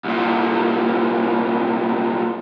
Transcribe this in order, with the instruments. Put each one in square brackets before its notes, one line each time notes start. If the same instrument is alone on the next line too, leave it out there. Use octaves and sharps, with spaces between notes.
[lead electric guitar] C2 A#2